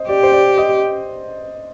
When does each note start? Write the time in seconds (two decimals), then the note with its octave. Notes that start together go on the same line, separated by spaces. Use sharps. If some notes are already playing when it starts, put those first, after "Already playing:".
Already playing: C5 D#5
0.09 G4 D5
0.23 C5
0.32 D5
0.58 D#5